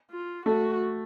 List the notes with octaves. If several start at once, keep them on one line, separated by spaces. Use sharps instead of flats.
F4
A3 F#4